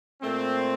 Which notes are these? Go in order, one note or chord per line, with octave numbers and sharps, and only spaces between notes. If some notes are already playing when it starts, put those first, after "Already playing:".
A#2 A3 C4